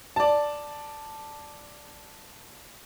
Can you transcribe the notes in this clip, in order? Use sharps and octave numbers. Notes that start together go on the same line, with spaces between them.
D5 A5